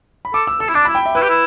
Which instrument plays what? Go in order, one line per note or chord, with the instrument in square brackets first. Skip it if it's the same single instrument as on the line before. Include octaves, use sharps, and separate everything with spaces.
[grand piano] B5
[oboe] A4 [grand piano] D6
[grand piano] E6
[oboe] A4 [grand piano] E6
[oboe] E4
[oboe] D4 [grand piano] D6
[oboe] E4 [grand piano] B5
[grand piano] G5
E5
[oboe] E4 [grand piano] B4
[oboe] G4
E4